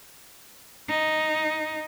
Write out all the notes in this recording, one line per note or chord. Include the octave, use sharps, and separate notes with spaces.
D#4